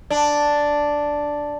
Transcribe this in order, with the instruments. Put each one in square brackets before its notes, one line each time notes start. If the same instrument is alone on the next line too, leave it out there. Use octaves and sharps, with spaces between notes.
[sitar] D4